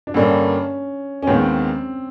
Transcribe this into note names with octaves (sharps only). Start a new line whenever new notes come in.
D4
G2 D3 G3 A#3 C#4
C#4
D#2 D#3 G#3 B3 C4